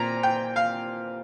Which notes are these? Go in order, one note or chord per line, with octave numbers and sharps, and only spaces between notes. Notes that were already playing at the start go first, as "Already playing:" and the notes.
Already playing: A#2 C4 A#5
G5
F5